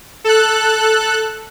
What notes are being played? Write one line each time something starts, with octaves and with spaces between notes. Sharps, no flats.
A4 F#6